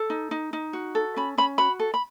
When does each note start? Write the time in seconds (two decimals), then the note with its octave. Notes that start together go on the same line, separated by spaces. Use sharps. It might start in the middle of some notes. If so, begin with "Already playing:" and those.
Already playing: A4
0.10 D#4
0.31 D#4
0.53 D#4
0.73 F#4
0.95 A4
1.16 C#4 B5
1.38 C#4 B5
1.58 F#4 B5
1.80 A4
1.94 B5